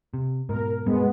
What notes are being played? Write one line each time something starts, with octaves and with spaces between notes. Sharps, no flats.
C3
G#2 B2 A#4
G2 B2 G#3 B3